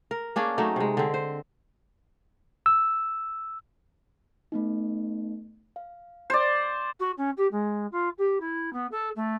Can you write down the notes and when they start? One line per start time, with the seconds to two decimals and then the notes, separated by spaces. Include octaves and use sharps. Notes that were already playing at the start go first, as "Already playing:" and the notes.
0.11 A#4
0.36 A#3 C#4 D4 G#4
0.58 F#3 A3 D#4
0.76 C3 G#3
0.97 D3 C4
1.14 C5
2.66 E6
4.52 A3 B3 D#4
5.76 F5
6.30 C5 D5
7.00 F#4
7.18 C#4
7.37 G4
7.52 G#3
7.92 F4
8.18 G4
8.40 E4
8.73 B3
8.91 A4
9.16 A3